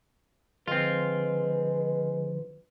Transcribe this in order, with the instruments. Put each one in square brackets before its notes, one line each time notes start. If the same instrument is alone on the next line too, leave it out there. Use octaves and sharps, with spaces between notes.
[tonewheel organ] D3 F3 [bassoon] G#3 [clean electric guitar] C4 F4 [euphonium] B4